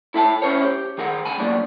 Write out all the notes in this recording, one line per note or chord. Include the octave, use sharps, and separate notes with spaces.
E4 A4 E5 G5 A5
C#4 E4 A#4 C5 C#5
G4
D#3 G#4 A#4 F#5
C#2 G#5 B5
F#3 G3 A#3 D4